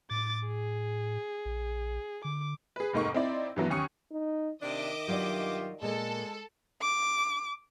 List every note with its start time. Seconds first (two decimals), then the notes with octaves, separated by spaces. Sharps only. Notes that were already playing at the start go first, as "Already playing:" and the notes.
0.11 A2 D6 A6
0.47 G#4
1.45 A#1
2.25 D3 D6
2.76 G#4 B4
2.93 F1 G#2 A#3 D#4 C#6
3.14 C4 D#4 E4 D5
3.56 G2 E3 F#3 B3
3.70 D#2 C#4 G#5 C#6 D#6 C#7
4.11 D#4
4.62 C3 D#3 D4 D#5 E5 D6
5.08 G2 F#3 F4 G4 D5
5.82 A#2 G#3 A#3 A4
6.81 D6